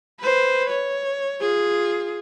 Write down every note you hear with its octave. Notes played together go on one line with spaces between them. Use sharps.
B4 C5
C#5
F4 G#4